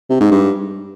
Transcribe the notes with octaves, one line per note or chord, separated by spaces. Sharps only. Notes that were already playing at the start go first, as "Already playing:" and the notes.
C3
G#2
G2